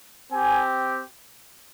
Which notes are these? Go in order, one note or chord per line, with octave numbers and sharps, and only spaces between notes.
C4 G4 G#5